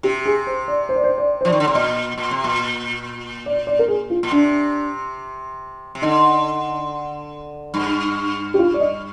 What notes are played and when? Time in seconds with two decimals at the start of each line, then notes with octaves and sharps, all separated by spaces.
0.03 C3 G4
0.26 G#4
0.47 C5
0.68 D5
0.89 C5
0.96 D5
1.04 C5
1.18 D5
1.41 C5
1.45 F3 D5
1.52 D#3
1.60 D3
1.66 C3 D5
1.75 A#2 D#5
2.18 A#2
2.31 C3
2.44 A#2
3.46 D5
3.67 D5
3.79 A#4
3.88 G#4
4.10 F4
4.23 A#2
4.31 C3 D4
5.95 C3
6.02 D3 D#4
7.74 G2
8.54 G4
8.59 F4
8.74 D5
8.80 D#5